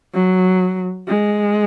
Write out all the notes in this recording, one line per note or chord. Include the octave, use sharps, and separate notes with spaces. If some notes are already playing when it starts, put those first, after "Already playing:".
F#3
G#3